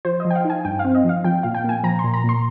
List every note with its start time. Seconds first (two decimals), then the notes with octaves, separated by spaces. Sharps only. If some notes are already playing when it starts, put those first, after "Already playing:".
0.05 F3 C5
0.20 F3 D#5
0.31 G5
0.35 F5
0.45 D#4
0.50 G#5
0.65 G2 G5
0.79 F5
0.85 C4
0.95 D#5
1.04 F3 F5
1.24 F3 G5
1.43 A#2 F5
1.55 G5
1.64 A#2 G#5
1.84 F3 A#5
1.99 C6
2.04 A#2
2.14 A#5
2.24 A#2 C6